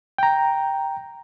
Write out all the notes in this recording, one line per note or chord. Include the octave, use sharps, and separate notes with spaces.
G5 A#5